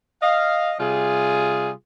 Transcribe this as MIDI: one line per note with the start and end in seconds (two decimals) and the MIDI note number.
0.22 0.73 75
0.22 0.73 77
0.79 1.70 48
0.79 1.70 55
0.79 1.70 65
0.79 1.70 68